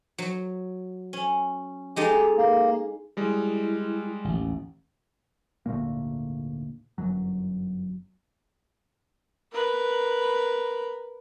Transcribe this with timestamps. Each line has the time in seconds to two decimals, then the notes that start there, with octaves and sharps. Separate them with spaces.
0.18 F#3
1.13 C#4
1.96 G#3 D#4 G4 A4
2.37 A#3
3.17 G3 G#3 E4
4.24 A1 D#2
5.66 G#1 D2 A#2 A#3
6.98 G1 F#2 F#3
9.52 A#4 B4